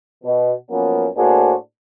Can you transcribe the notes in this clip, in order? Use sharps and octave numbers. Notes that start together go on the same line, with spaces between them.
B2
F#2 F3 A#3 B3 C#4
A2 A#3 D4 F#4 G#4 C5